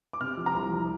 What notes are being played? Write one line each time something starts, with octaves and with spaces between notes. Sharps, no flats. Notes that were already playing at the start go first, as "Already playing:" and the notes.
D6
C3 F6
F3
A#5
C2
F3